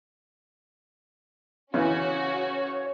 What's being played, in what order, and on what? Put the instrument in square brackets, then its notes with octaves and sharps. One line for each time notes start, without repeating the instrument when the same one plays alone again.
[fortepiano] C#3 E3 [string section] C#4 F#4 [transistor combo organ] C#5